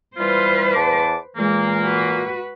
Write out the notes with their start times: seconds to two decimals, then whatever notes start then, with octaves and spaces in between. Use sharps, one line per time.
0.17 E3 G3 F4 B4 C5
0.74 E2 A5 D6
1.36 A#2 E3 G#3 A#3
1.82 F#4 B4